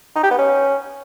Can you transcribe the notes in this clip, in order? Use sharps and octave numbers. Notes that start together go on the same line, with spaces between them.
D#4
G4
B3
C#4